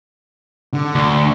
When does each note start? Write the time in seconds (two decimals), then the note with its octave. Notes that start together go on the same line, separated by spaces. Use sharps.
0.74 D3
0.95 D2